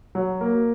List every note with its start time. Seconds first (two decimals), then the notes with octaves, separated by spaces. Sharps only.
0.15 F#3
0.41 A#3